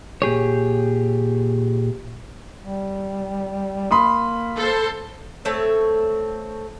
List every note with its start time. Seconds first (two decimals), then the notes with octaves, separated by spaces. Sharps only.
0.22 A#2 G4 G#4 C#5
2.60 G3
3.91 A#3 B5 C6 D#6
4.56 A4 C5
5.45 A3 C4 A4 C#5